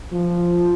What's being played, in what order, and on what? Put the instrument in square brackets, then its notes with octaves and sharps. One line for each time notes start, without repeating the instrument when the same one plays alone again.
[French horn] F3